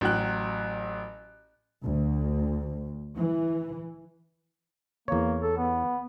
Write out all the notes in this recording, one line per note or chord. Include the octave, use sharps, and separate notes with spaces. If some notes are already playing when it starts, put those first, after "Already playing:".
A1 F#3 G5 F#6
D2
E3
E2 A#3 C#5
A4
B3